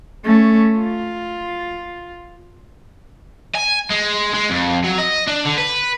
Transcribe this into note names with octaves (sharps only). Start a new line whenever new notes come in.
A3 C#4
F4
G#5
G#3
G#3
F2
F#3
D#5
D4
D3
B4